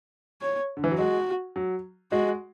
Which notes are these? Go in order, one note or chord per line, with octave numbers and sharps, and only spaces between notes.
C#5
D3
E3
F#3
G#3 F#4
F#3
G#3 F#4